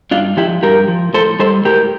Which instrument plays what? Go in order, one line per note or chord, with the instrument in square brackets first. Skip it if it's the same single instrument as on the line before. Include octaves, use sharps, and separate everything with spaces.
[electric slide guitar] G2 D4 F4
F3 E4 G4
G2 G4 A#4
F3
A2 A4 C5
G3 A4 C5
A2 G4 A#4